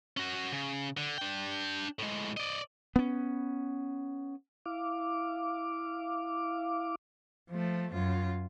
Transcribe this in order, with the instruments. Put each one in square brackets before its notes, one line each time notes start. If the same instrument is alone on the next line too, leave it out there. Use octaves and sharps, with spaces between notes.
[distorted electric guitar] C#4 F#4
C#3
D3
D4 G5
A2 G#3
D5 D#5
[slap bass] B3 C#4
[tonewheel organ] E4 F5 D6
[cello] F3 A3
F#2 F4